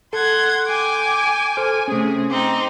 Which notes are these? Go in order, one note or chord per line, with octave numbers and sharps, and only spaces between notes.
A4 F#5 C6 G#6
G5 G#5 D6
A4 C5 G#5 F6
C3 A3 C#4 G#4
C4 D#4 D6